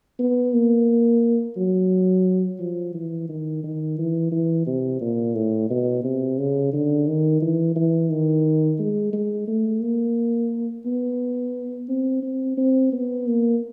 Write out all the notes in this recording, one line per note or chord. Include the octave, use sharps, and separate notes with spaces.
B3
A#3
F#3
F3
E3
D#3
D#3
E3
E3
C3
A#2
A2
B2
C3
C#3
D3
D#3
E3
E3
D#3
G#3
G#3
A3
A#3
B3
C4
C4
C4
B3
A#3